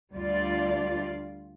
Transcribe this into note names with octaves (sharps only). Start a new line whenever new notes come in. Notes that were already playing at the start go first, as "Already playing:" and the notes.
D2 G3 F4 D5